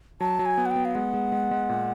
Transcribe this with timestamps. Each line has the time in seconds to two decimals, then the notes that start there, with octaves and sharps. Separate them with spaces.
0.21 F#3 A5
0.39 F#3
0.46 G#5
0.58 B3
0.66 F#5
0.71 G5
0.76 B3
0.85 F5
0.95 G#3 F#5
1.14 G#3
1.32 G#3
1.51 G#3
1.69 A#2